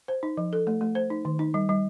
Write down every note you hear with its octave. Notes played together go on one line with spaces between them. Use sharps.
C5
D#4
F3
A4
A3
A3
C5
D#4
D#3
D#4
G3
G3